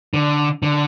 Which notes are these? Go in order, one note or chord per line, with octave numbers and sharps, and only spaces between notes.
D3
D3